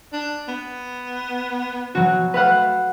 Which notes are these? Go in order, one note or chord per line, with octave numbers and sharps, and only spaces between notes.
D4
B3
B2 F#3 F#4
A3 B4 F5 F#5